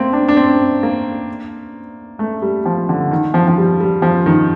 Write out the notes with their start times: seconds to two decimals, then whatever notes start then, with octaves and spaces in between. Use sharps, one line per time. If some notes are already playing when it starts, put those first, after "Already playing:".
Already playing: A3 A#3 C4
0.13 D4
0.28 D4
0.37 C4
0.83 A#3
2.19 A3
2.42 G3
2.66 F3
2.89 D3
3.11 D#3
3.34 F3
3.48 F3
3.58 G3
3.81 G3
4.02 F3
4.26 D#3